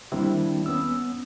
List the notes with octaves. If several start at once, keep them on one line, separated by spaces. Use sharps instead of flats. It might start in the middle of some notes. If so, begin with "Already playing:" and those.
D#3 G3 A#3 C4 D4 E4
B3 C#4 E6